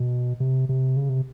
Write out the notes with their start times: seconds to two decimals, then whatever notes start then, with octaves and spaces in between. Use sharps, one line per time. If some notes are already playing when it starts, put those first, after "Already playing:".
Already playing: B2
0.40 C3
0.69 C3
0.97 C#3
1.09 C3